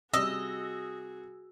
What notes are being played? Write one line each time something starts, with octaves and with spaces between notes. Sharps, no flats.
C3 G3 F#4 G#4 D#5 E6